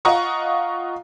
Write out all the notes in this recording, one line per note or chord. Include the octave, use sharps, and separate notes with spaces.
F4 D#5 F#5 A#5 C#6 D#6